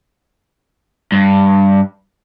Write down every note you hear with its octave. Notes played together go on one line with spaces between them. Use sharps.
G2